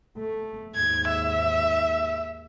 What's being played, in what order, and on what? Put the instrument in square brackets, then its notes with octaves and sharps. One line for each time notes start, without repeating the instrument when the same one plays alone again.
[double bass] A3
[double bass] D#2 G#2 [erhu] G#6
[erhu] E5